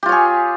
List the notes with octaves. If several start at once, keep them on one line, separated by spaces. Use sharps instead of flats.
F4 G4 G#4 C#5